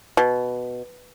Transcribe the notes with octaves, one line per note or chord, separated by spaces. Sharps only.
B2